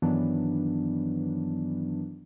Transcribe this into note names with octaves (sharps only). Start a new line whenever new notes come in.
G2 D#3 E3 F#3 B3 D4